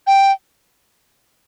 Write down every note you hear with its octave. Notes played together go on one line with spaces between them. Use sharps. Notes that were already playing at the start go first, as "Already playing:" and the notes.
G5